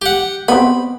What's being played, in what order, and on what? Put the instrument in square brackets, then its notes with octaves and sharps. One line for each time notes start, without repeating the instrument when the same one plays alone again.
[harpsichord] G4 F#5
[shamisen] B3 C4 [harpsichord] B5